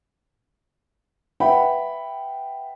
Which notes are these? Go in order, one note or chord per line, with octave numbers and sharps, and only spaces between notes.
B4 E5 F#5 G5 B5